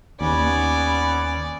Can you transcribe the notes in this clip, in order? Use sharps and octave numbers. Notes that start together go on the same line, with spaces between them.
D#2 B3 C#4 D5